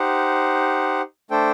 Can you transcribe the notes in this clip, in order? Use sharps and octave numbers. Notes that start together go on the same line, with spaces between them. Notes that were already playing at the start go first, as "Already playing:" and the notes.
Already playing: D#4 G4 C5 F#5
A3 D4 A4 C5 G5